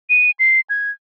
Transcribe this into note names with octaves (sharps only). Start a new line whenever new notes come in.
D#7
C7
G#6